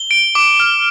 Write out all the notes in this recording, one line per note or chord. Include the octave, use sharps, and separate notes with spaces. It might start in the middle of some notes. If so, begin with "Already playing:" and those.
Already playing: G7
D7
D6
F6